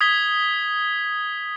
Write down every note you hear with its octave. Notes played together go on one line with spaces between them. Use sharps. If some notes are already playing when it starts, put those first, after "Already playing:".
D#6 G#6 B6 G7